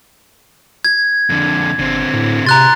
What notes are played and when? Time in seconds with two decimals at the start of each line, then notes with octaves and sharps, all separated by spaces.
0.85 G#6
1.29 F2 D3
1.79 G1 D3 C4
2.13 A2
2.46 C3 A#5 C6 F#6 A6